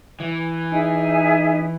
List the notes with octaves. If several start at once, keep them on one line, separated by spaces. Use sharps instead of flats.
E3
D#4 G#4 E5 G#5